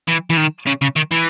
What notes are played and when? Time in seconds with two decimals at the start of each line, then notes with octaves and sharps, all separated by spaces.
0.08 E3
0.30 E3
0.37 D#3
0.67 C#3
0.82 C#3
0.96 D#3
1.11 E3